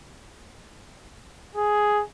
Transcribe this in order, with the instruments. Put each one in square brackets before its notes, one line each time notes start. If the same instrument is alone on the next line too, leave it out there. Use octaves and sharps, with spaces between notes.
[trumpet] G#4